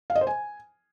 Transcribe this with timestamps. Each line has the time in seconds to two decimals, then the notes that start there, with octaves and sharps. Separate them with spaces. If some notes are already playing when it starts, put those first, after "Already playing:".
0.10 F5
0.15 D#5
0.21 C5
0.27 G#5